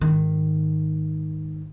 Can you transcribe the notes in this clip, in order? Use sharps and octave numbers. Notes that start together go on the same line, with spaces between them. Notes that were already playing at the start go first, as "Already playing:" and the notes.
G#2 D#3